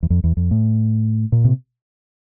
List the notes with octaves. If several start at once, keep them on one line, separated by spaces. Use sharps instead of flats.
E2
F2
E2
F2
A2
A#2
C3